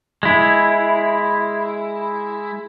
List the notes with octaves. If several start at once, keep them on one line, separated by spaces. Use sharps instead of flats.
G#3 E4